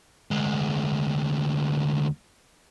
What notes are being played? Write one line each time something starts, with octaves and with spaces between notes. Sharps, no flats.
D2 G#3